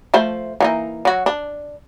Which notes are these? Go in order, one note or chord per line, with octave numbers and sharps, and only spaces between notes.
F3 A3 C5
E3 A#3 D#4
F#3 F#4
D4